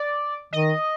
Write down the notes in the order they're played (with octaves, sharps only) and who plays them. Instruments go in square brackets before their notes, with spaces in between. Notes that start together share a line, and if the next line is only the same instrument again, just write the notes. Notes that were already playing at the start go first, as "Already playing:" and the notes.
Already playing: [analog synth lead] D5
[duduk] D#3 [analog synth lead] D#5